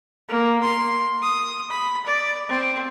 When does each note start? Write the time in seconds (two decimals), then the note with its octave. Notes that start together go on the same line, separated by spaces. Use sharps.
0.28 A#3
0.63 C6
1.22 D#6
1.70 B5
2.06 D5
2.49 C4